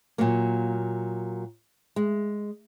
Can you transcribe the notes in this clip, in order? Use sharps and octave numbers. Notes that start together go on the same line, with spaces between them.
A#2 F#3 A#3
G#3